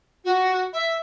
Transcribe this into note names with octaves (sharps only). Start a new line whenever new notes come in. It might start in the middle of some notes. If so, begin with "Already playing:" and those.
F#4
E5